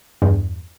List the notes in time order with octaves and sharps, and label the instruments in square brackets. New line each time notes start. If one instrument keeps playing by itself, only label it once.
[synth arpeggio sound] E2 G2